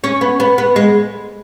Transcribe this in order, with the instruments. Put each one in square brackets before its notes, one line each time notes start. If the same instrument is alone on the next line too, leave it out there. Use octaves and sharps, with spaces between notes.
[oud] C#4
B3
B3
B3
G#3